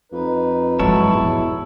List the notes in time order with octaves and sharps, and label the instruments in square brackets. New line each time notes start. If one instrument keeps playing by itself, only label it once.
[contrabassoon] F2 [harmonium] D#4 B4
[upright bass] G#2 F3 [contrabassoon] F#3 [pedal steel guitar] E4 C#5 A5
[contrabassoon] E2 [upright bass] B2